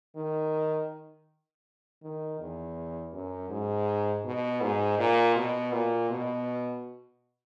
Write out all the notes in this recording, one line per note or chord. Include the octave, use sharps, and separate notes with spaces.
D#3
D#3
E2
F#2
G#2
B2
G#2
A#2
B2
A#2
B2